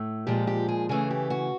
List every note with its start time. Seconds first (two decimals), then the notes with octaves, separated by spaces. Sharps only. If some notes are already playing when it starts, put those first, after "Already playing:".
Already playing: A2 A3
0.27 A#2 F3 G#3 G4
0.47 G4
0.68 G#4
0.89 C#3 E3 A3 G#4
1.10 G4
1.30 F#4